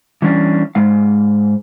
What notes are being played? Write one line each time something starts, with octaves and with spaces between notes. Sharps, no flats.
E3 G3 C#4 D4
G#2 G#3 F5